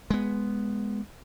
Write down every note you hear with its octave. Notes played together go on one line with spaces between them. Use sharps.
G#3 B3